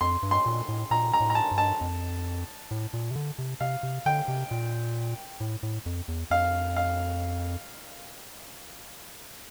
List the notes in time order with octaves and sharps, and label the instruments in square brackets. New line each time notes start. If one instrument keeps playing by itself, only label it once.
[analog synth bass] F2 [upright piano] C6
[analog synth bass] G2
[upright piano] C6
[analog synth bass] A#2
A2
[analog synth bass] A#2 [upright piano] A#5
[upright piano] A#5
[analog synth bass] A2
[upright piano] A#5
A5
[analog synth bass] G2
[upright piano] A5
[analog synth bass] F2
A2
A#2
C3
D3
C3
[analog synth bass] C3 [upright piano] F5
[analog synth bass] C3
[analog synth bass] D3 [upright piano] G5
[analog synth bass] C3
A#2
A2
A2
F2
E2
[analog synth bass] F2 [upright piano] F5
[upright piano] F5